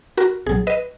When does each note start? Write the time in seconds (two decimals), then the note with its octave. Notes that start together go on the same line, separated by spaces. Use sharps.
0.17 F#4 A#4
0.46 B1 A#2 F#3 G#4
0.67 B4 D#5